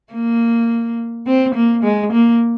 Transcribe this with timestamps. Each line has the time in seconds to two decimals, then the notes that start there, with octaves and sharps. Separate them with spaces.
0.13 A#3
1.27 C4
1.55 A#3
1.83 G#3
2.12 A#3